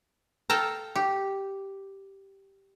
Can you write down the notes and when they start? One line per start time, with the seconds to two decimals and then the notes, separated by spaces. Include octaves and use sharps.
0.50 A4 F5 G5 A5 A#5
0.96 G4